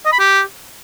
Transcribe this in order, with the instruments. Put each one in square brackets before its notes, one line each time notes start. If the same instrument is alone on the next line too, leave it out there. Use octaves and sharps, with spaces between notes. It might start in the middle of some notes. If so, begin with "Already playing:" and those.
[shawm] D#5
B5
G4